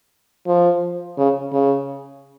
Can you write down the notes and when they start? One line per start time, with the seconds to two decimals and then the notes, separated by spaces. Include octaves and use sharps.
0.47 F3
1.18 C#3
1.53 C#3